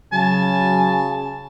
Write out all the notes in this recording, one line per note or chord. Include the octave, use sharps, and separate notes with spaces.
C#3 F#3 G#5 A5